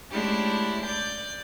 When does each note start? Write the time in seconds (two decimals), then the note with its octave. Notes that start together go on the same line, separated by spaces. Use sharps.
0.11 G#3 A3 C#4 D4 E4 G4
0.85 D5 G6